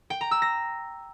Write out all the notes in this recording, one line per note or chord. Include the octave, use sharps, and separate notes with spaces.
G5
A#5
E6
A#6